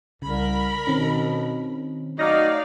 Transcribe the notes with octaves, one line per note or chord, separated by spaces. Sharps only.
C2 C#3 A#4 B5
B2 D#3 C4 C#4
F#3 A3 D#4 D5 F5 A#5 F6 A#6